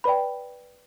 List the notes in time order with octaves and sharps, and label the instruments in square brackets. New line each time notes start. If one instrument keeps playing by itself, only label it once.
[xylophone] B4 D5 G5 B5